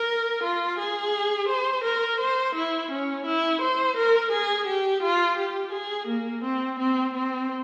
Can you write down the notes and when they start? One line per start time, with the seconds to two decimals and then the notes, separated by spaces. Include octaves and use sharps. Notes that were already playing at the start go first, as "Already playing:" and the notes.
Already playing: A#4
0.44 F4
0.79 G#4
1.49 C5
1.84 A#4
2.20 C5
2.55 E4
2.91 C#4
3.26 E4
3.62 C5
3.97 A#4
4.32 G#4
4.67 G4
5.03 F4
5.37 G4
5.73 G#4
6.08 A#3
6.44 C4
6.80 C4
7.14 C4